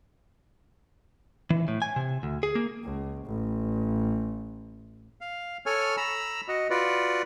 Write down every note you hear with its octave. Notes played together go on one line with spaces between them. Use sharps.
E3
A2
G#5
C3
D2
G#4
A#3
C#2
A1
F5
A4 C#5 G#5 F6
A#5 B5 E6
F#4 D#5
F4 F#4 B4 D5